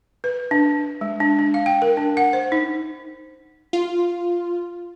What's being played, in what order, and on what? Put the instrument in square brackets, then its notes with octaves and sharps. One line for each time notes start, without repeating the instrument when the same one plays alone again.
[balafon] B4
D4
G#3
D4
D4
F5
G5
A#4
D4
F#5
C5
D#4
[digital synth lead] F4